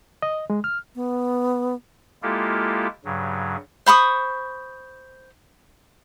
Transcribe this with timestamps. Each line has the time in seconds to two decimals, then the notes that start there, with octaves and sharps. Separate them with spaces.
0.22 D#5
0.50 G#3
0.64 F6
0.95 B3
2.23 G#3 A#3 E4 F4 G4 A4
3.05 G2 C#3 F#3
3.86 C5 B5 C#6 D#6